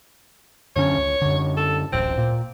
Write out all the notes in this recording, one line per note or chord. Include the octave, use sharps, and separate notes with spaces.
F#2 D3 C#4 C#5
C#2
F#2 D3
A4
D1 A1 C4
A#2